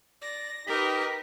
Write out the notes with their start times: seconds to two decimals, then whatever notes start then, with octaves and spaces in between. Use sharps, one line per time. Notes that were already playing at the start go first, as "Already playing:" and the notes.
0.21 D5 A#6
0.67 D#4 G4 A#4 B4 D#5 B6